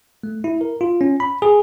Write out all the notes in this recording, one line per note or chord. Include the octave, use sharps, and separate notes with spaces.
A3
E4
A#4
F4
C#4
B5
G#4